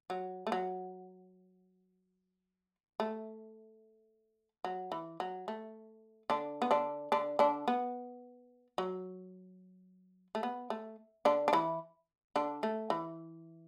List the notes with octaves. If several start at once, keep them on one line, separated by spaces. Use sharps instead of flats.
F#3
A3
F#3
A3
F#3
E3
F#3
A3
D3 D4
B3
D3 D4
D3 D4
D3 D4
B3
F#3
A3
B3
A3
D3 D4
D4
E3 E4
D3 D4
A3
E3